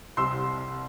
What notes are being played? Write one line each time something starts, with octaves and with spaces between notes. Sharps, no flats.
C2 C3 G3 C6 E6